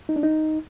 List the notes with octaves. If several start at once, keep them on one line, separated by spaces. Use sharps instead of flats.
D#4
D4
D#4